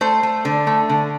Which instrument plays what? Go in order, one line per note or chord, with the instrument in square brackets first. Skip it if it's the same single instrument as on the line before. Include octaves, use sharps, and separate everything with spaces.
[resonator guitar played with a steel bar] A3 C5
A3
D3
A3
D3